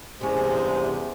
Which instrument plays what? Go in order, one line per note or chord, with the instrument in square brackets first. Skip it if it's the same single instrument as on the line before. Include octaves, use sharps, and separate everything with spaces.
[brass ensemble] E2 [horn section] G2 G#3 [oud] C3 C#4 [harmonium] G4 C5